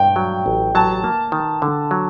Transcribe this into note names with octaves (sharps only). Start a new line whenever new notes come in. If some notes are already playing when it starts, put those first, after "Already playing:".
Already playing: G2 G5
F#3
A1
F#3 A5
A#3
D#3
D3
F#3